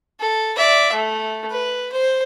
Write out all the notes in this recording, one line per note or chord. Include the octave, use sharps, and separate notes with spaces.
A4
D5 E5
A3
B4
C5